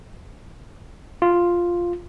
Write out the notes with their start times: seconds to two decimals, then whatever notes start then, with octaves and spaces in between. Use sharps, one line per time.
1.22 F4